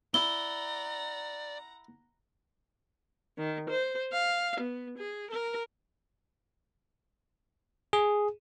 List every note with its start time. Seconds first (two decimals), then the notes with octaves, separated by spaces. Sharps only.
0.14 E4 D5 F#5 A#5 G7
3.38 D#3
3.69 C5
4.13 F5
4.60 B3
4.98 G#4
5.31 A#4
7.93 G#4